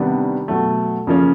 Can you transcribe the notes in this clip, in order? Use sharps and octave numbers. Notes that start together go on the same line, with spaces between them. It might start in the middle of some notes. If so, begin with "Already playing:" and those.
Already playing: C3 D#3 G3 B3 D4
B2 F#3 A3
C#3 F3 A#3 C#4